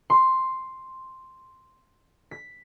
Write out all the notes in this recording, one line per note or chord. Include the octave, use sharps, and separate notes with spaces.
C6
B6